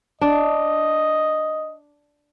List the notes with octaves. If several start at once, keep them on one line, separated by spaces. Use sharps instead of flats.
D4 D#5